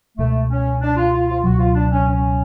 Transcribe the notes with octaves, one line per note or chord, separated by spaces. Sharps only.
C#2 B2 G#3 A3
C#4
D4
F4
F4
F4
C#2 B2 F#3 F#4
F4
D4
C#4
C#4